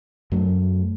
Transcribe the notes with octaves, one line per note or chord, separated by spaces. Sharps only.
F#2 F#3 A3